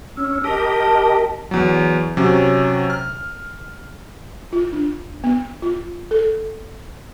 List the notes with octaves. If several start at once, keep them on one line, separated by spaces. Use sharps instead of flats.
C#4 E6
G4 A#4 D#5 A5
E2 F#3
C3 F#3 C#4
F6
F4
D4
B3
F4
A4